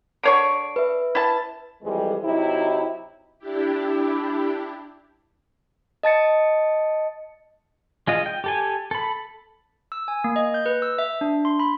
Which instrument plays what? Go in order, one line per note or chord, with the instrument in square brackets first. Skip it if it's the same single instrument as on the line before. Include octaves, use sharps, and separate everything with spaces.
[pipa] D3 C#5 C#6 [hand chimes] C7 D7
[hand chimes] B4 E5
[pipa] E4 A5
[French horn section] F2 E3 G3 G#3
C3 F#3 D#4 E4
[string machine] D4 E4 G4
[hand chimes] D#5 A5 A6 C#7
[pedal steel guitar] G#3 F4 D#5
G5
G4 A4 G#5
A4 B5
[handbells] E6
G#5
A#3
D#5
G6
B4
E6
E5
D4
C6
B5